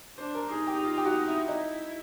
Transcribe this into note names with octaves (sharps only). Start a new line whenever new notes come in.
D4 C5
A#4
D#4 G#4
G4
F4
G4
F#4
E4
D#4 E4